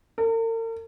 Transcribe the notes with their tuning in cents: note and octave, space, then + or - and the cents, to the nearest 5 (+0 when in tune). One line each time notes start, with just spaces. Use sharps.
A#4 -45